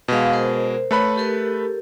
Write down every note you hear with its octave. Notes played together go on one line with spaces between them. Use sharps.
B2 G#3 B4 F5
A#4 C5
A3 A4 B4 C#5 B5
G4 A4 A#4